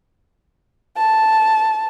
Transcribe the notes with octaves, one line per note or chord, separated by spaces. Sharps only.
A5